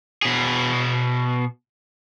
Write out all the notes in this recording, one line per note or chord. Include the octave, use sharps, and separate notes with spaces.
B2 G#4